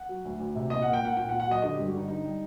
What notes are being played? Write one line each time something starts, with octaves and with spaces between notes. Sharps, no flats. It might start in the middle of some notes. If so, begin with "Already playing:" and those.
Already playing: F#5
F#3
D2
D2
C3
A#2 D#5
A#3 F#5
G5
A#3 F#5
A#2 G5
F#5
A#2
F#5
F#3 D#5
D3 D#5
G2 G4
F#4
D3 D#4
G3 D#4
G3